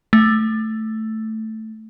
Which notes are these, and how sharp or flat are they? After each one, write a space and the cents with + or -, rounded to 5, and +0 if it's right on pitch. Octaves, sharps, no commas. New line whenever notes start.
A3 +0